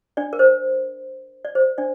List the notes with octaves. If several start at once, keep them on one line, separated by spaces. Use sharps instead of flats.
D4 D5
A#4
C5
D5
C5
D4 D5